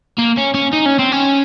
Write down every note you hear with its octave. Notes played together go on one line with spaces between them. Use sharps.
A#3
C#4
C#4
D#4
C#4
C4
C#4